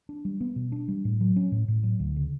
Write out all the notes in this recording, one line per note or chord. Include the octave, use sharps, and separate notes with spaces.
D4
G3
B3
B2
D4
G3
A2
F#3
C#4
A2
A2
F#3
D2
C#3